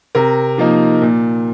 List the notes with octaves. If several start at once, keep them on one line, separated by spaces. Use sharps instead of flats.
C3 A#4
F3 A#3 D#4
A#2